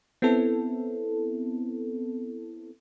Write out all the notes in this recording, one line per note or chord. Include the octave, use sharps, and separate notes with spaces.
B3 C4 E4 A4